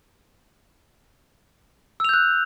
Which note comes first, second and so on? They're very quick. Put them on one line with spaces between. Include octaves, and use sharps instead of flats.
E6 F7 G6 F#6